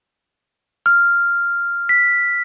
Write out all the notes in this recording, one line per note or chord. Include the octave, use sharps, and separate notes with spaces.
F6
B6